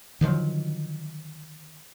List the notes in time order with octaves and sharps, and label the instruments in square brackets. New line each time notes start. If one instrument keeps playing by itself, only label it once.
[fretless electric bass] D3 D#3 F3 F#3